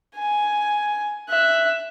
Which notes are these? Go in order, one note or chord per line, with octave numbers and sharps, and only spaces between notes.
G#5
E5 F#6